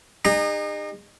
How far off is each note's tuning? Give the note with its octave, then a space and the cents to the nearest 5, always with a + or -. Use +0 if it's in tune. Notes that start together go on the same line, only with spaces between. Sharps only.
D#4 -35 G#4 -45 A#5 -10